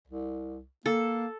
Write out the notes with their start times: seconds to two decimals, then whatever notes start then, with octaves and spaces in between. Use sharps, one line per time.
0.07 C2
0.86 A#3 A4